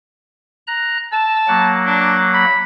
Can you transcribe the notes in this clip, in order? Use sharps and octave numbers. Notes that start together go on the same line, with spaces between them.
A#5 F#6
A5 E6
F#3 A#3 F#5
D4
B5